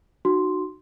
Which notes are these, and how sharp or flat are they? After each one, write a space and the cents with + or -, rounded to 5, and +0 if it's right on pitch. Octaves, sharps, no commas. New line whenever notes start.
D#4 -30 F#4 +0 C6 +0